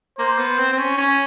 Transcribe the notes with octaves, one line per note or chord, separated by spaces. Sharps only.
A#3 C5
B3
C4
C4
C#4
C#4